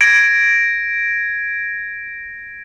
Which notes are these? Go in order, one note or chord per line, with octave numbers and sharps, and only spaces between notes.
G#6 A#6 D7